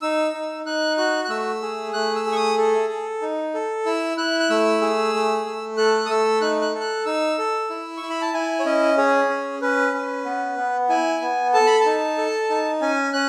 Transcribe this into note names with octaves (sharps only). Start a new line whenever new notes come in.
D#4 E6
D#4
D#4 F#6
F#4 F#6
F#6
A3 E6
G#4
A3 F#6
E6
G#4
C#6
D#6
A4
A4
D#4
A4
E4 E6
E4 F#6
F#6
A3 E6
G#4
A3
A3
A4 F#6
D#6
A3 E6
D#4 F#6
F#6
A4
F#6
D#4 E6
A4
E4
E4 C#6
B5
A5
E4 G#5
C#5
C#4 D#5
G#4 C#5
C#4
C#4 B4
C#4
B3
B3
E4 G#5
B3
A4 A5
B5
A5
D#4
A4
D#4
C#4 G#5
C#4 F#6